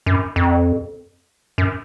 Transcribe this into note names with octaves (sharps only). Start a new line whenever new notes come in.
F#2
F2
F#2